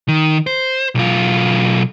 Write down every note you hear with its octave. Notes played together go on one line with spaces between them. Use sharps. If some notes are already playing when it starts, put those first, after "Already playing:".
D#3
C5
B1 F4